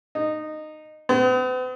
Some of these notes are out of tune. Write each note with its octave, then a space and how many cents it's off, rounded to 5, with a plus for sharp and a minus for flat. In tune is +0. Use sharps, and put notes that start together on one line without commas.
D#4 -15
B3 +45